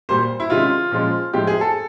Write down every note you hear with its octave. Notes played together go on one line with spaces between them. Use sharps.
A#2 G3 A#3 C5
E4
C3 D#3 G#3 C#4 F4
A#2 F3 G#3 C#4
A2 F3 G#3 C4 G4
G#4
A4